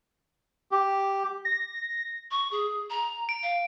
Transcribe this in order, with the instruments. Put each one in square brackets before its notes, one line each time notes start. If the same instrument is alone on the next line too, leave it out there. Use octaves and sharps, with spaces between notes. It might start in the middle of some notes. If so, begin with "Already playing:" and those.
[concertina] G4
[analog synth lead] A#6
[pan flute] C#6
G#4
A#5
[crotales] D7
[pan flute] F5